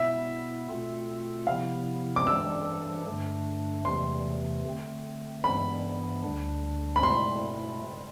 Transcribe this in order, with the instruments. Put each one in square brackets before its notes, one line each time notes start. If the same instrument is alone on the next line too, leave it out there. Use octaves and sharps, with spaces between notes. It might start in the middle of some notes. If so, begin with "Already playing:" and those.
Already playing: [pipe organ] B2 B3 E4 [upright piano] E5
[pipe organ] B2 A3 C4 F4 A4
[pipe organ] C3 F3 B3 E4 [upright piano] F5
[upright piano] D6
[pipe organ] E3 G3 D4 A4 [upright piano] E6
[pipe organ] G2 D3 A3 D4
[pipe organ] E2 C3 E3 A3 [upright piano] C6
[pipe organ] D3 A3 C4
[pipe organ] G2 E3 B3 [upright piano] B5
[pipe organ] D2 D3 G3 D4
[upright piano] B5
[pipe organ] B2 A3 E4 [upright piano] C6